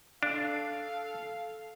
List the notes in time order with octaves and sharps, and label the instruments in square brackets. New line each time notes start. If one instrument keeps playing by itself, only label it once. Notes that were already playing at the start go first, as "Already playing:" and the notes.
[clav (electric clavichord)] D4 [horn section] A4 F5